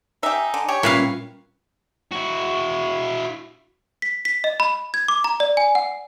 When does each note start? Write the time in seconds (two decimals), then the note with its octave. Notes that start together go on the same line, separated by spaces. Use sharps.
0.23 D#4 G4 E5 G#5
0.54 D3
0.69 G4 C#5
0.83 A#2 G3 C#4 E4 F4 B4 F5
2.11 E4 F#4
4.02 B6
4.25 B6
4.44 D#5
4.60 B5
4.94 G#6
5.08 D6
5.24 A#5
5.40 D5
5.57 G#5
5.75 F#5